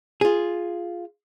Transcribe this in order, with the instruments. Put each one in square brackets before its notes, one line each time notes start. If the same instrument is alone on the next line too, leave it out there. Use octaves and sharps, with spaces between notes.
[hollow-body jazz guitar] F4 G#4